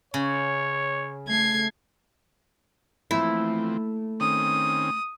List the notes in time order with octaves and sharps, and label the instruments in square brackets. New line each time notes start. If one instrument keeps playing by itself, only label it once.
[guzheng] C#3 [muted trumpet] C#5
[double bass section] A3 [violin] G#6 C7
[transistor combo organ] E3 F3 C4 [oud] A3 A#3 [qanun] E4
[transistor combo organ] D#3 C4 C#4 [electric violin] D#6